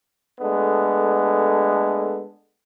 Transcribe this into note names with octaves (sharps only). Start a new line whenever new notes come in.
G#3 A3 B3 D4 A4